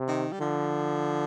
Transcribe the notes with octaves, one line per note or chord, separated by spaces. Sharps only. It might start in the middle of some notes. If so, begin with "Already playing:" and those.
Already playing: C3
D#3
G3
D3 F3